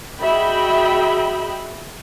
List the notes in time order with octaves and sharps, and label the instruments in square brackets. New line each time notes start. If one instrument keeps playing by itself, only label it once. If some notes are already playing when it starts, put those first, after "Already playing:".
[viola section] F#4 G#4 D#5 E5 G5 B5